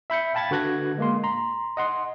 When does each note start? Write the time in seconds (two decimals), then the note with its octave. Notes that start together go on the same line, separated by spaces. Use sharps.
0.10 E5 B5 G6 C#7
0.34 F5 G5 A5 B5 G#6 A6
0.51 D3 F#4 B4 F#6 G#6 A#6
0.98 G#3 A#3 C6
1.24 A#5 C6
1.77 D#5 F#5 C6